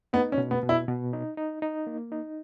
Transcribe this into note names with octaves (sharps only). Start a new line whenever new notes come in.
B3 D#4
C#4
B2
B3
B2
E4
B2
D#4
D#4
D#4
A#3
D#4